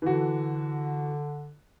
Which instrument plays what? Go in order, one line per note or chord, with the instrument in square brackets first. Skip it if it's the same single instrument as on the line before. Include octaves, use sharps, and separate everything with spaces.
[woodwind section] D3 [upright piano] E3 F#4